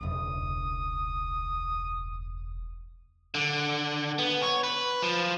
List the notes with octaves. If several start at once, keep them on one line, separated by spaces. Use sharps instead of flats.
E1 C#2 D#6
D3
B3
C#5
B4
F3